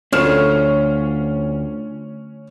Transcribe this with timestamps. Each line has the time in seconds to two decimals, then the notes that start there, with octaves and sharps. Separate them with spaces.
0.13 D2 C#4 D4 F4 C5 C#5 F6 E7